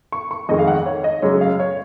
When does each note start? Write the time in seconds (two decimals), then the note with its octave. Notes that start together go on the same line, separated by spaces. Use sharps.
0.12 C#6
0.31 C#6
0.49 F2 D#3 G#3 D#5
0.59 F5
0.67 F#5
0.86 C#5
1.04 D#5
1.22 F#2 C#3 G#3 C#5
1.41 F5
1.60 C#5